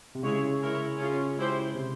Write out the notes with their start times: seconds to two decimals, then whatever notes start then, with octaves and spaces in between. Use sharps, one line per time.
0.15 C3
0.23 C#3 G#3 E4 G#4 C#5
0.61 G#3 E4 A#4 C#5
0.98 C#4 F4 G#4
1.37 G#3 E4 G4 C5
1.75 C3